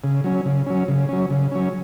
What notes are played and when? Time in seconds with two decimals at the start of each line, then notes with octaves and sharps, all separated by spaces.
0.04 C#3
0.24 F#3 C#4
0.46 C#3
0.66 F#3 C#4
0.88 C#3
1.09 F#3 C#4
1.30 C#3
1.52 F#3 C#4